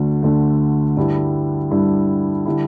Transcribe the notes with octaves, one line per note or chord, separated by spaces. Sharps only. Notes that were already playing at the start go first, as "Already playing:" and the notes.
Already playing: D2 D3 A3
D2 D3 A3
G2 D3 G3 E4
G2 D3 G3 E4
D3 G3 E4